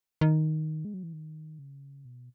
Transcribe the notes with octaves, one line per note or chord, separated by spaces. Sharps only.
D#3
G#3
F#3
E3
D#3
C#3
B2